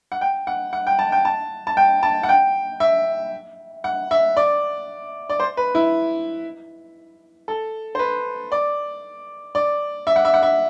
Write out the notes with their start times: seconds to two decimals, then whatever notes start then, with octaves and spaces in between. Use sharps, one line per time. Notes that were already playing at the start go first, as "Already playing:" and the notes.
0.12 F#5
0.21 G5
0.47 F#5
0.73 F#5
0.87 G5
0.99 A5
1.12 G5
1.25 A5
1.67 A5
1.77 G5
2.03 A5
2.23 F#5
2.29 G5
2.80 E5
3.84 F#5
4.11 E5
4.37 D5
5.30 D5
5.40 C5
5.57 B4
5.75 E4
7.48 A4
7.95 C5
7.99 B4
8.52 D5
9.55 D5
10.07 E5
10.16 F#5
10.25 E5
10.34 F#5
10.43 E5